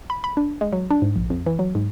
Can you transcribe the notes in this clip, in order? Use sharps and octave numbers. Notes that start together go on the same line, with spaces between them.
B5
B5
D4
G#3
F#3
D4
G#2
A#1
F2
E3
F#3
G#2